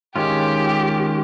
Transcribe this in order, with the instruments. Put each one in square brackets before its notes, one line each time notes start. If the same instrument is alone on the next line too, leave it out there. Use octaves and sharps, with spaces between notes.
[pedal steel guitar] D#3 G#3 C#4 F4 [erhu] G4